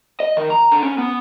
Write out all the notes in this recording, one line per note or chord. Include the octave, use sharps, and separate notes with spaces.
D#5
D#3
A#5
D3
C#4
B3